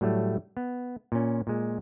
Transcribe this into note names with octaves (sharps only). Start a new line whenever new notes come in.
A2 F#3 G3 A3
B3
A#2 C#4
A#2 G#3